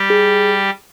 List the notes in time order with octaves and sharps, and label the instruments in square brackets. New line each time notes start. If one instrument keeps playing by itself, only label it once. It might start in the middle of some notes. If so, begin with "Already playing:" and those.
Already playing: [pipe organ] G3 G4
[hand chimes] G#4